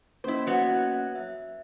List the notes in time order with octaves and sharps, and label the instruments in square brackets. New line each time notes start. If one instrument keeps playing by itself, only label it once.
[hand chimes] A#3 C#4 D#5 [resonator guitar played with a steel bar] E4 C5
[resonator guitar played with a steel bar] F#3 B3
[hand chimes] E5